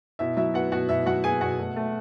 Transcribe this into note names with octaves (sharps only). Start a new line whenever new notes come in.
B2 E4 E5
F#3 E4 E5
B3 F#4 F#5
B2 F#4 F#5
B2 E4 E5
F#3 F#4 F#5
B3 G#4 G#5
B2 F#4 F#5
A3
A3